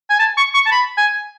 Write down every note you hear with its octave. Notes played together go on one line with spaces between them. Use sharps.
G#5
A5
C#6
C#6
A5
B5
G#5